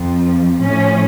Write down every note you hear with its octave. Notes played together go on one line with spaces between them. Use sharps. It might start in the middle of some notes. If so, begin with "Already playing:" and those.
Already playing: F2 F3
A2 F3 C#4